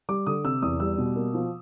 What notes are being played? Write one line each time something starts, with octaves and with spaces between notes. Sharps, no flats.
G3 D6
D3 D#6
C3 E6
E2 D#6
G3 E6
B2
A#3
F3